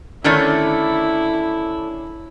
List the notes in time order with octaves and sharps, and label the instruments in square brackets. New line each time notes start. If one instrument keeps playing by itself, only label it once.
[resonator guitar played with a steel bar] D3 D#3 A3 [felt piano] C#4 D4 C#5 [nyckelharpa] E4